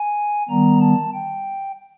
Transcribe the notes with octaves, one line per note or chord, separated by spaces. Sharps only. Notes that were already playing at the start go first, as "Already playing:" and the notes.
Already playing: G#5
D#3 G3 B3 A#5
A5
G5